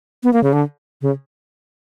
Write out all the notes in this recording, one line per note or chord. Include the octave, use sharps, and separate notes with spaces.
B3
A#3
C#3
D3
C#3